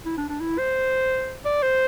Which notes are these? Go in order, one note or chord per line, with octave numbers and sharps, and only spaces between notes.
E4
D4
D4
E4
C5
D5
C5